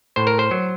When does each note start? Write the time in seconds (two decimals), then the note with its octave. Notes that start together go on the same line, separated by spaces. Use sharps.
0.16 A2 C5
0.27 A#4
0.39 C5
0.51 F#3